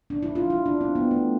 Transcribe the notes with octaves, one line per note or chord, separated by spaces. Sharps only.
D4
E4
F4
E4
D4
C4
B3
A3